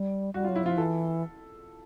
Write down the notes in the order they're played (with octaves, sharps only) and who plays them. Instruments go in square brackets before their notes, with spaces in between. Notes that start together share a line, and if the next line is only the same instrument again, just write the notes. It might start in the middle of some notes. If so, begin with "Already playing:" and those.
Already playing: [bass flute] G3
[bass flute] G3 [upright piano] F#4
[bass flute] F#3 [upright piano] F4
[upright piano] E4
[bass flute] F3 [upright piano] F4
[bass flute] E3 [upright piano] A4